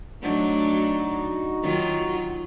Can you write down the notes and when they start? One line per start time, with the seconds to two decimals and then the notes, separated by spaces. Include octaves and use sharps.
0.22 F#3 A3 D4 D#4 F#4
1.63 D#3 F#3 F4